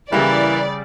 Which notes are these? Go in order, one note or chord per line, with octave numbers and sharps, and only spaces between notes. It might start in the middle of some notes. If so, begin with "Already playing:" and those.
C#3 E3 G3 A#3 E4 D5